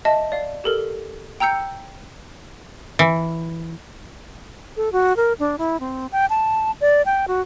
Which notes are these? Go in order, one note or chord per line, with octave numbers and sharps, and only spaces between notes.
D#5 E5 A5
D5 F5
G4 A4 A#4
G5 A#5 E6 G6 C#7
E3
A4
F#4
A#4
D4
E4
C4
G5
A5
D5
G5
F#4